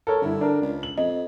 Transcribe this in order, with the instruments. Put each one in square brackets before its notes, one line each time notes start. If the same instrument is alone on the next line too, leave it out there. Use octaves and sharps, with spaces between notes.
[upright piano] A4 A#4 C#5
[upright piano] G2 E4 [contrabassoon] D3
[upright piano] D4 A#4
[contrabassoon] C#2
[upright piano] F#7
[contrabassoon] F2 [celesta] D#5